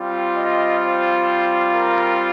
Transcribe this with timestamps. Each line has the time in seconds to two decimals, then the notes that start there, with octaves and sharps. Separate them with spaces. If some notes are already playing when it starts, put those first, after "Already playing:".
Already playing: G3 C4 F4
0.37 D#5
0.82 C5
1.74 A#4